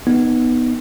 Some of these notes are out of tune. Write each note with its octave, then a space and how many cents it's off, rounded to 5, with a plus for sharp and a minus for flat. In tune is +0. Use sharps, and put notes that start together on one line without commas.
B3 +0 D#4 -5